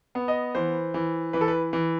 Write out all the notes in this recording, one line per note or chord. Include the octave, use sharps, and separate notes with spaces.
B3
D#5
E3 C5
E3
E3 B4
A4
B4
E3